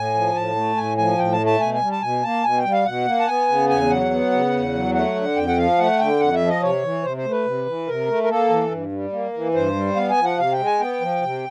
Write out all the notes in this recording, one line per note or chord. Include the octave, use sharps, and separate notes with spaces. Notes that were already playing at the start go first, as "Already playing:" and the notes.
Already playing: A2 G#5
F3
A2 A5
A3
A2 G#5
F3 G#5
A2 G5
A5
A3
A5
B2 G#5
G#5
G3
A5
B2 G#5
A#3 A5
B2 G#5
G5
G3
F5
B2 F#5
A#3
A5
B3 G#5
C#3
E2 G#5
F#3 F#5
B3
C#3
E2
F#3
A3 F#5
D3
F2 G5
F#5
F3 F5
A3 F#5
D3 G5
F2 F#5
E5
F3
D#5
C3 C#5
E3
C3 C5
C5
A3
B4
C3
E3
C3 A#4
A3
A#4
A#3 A4
E3
G2
G3
A#3
E3
G2 C5
G3
B3 F5
G#5
F3
F#5
C3 F5
G5
G#3
G#5
B3 G5
F3
C3